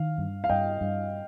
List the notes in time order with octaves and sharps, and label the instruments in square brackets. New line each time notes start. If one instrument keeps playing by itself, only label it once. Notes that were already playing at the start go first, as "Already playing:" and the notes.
Already playing: [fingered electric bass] D#3 [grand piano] F5
[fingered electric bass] G2
[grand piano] F5
[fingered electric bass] G2 [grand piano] D#5 G5
[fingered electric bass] G2